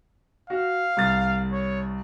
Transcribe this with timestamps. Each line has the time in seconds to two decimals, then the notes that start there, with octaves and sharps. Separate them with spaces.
0.50 F#4 F5
0.97 C2 A6
1.53 C#5